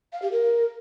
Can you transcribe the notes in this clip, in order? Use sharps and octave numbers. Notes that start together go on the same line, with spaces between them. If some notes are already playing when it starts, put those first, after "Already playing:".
F5
G4
A#4